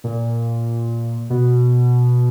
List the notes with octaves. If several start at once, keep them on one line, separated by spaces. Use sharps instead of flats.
A#2
B2